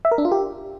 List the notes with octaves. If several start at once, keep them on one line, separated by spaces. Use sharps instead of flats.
E5
A#4
D4
F4
G4